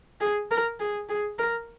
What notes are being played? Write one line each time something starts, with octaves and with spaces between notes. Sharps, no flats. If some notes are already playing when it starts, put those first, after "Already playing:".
G#4
A#4
G#4
G#4
A#4